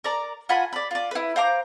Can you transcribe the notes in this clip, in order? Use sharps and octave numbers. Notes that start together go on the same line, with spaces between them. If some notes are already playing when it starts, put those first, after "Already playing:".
A#4 D5 A#5
F4 F#4 G#5 B5
D5 B5
F4 D5
E4 B4
C5 F5 A#5 D6